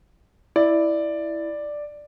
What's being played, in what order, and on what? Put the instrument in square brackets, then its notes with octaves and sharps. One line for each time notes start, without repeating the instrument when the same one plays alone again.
[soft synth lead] E4 [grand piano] D5